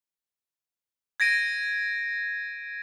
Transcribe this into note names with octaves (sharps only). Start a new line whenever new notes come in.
G#6 A#6 D7 D#7